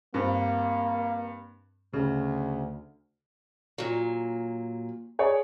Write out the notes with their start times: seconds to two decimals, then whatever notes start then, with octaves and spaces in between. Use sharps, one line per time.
0.14 G2 A#3 C4
1.93 D2 C#3
3.78 A#2 F#3
5.19 G#4 C#5 D5